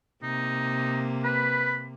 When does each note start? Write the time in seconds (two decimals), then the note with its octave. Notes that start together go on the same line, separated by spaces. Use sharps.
0.23 C3 A#3 D#4
1.24 B4 B5